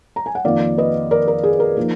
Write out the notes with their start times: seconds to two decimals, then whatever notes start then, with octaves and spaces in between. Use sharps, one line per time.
0.16 A#5
0.26 G#5
0.35 F#5
0.44 F2 D#3 A#3 D#4 D5 F5
0.78 B4 D#5
1.11 A#4 D5
1.28 A#4
1.44 G#4
1.60 A#4
1.77 F3 A#3 D#4